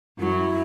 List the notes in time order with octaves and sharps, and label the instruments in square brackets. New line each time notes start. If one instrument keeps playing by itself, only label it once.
[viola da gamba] F#2 F#3 [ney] E4 F#4